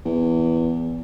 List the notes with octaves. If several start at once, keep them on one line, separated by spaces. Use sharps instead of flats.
E2